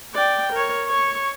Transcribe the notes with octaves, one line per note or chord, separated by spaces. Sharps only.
D5 G5
A#4 C#5
C#5 C#6